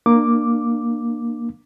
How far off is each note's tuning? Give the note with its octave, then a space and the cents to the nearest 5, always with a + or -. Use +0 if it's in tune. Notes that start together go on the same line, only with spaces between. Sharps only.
A#3 +5 D4 +30 D6 +0